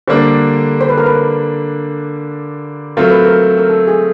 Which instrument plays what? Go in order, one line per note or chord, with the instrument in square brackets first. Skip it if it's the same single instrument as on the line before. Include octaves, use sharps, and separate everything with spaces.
[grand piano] D3 G3 A#3 D4 [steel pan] C5
[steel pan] C5
B4
A#4
B4
[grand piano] F#3 A3 C4 F4 [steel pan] A#4
[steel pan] B4
A#4
A#4
A4
G#4